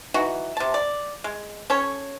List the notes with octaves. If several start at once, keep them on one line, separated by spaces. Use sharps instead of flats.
E3 D#4 F#4
C3 A5
D5
G#3
C#4 A4 C#5